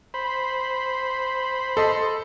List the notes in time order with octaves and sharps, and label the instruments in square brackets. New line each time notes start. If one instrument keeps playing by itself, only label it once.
[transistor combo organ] C5 B5
[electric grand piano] A4 D#5 C6